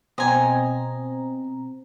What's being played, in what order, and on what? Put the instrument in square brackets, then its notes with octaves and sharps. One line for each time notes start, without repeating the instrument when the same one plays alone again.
[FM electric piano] B2 C4 A#5 [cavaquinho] D#5 G#5